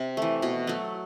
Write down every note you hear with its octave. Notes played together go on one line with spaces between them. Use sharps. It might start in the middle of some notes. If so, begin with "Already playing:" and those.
Already playing: C3
E3 A3
B2 F#4
F#3 A3